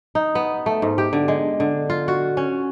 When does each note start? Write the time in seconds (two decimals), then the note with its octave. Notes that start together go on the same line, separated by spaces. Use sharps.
0.15 D#4
0.35 B3
0.66 A3
0.82 G#2
0.98 G4
1.13 D3
1.28 G#3
1.60 D3
1.90 F4
2.08 F#4
2.37 C#4